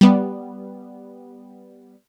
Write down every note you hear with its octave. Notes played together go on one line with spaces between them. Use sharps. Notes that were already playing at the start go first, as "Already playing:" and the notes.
G3 B3